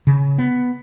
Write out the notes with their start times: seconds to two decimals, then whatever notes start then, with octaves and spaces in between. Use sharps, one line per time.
0.07 C#3
0.38 B3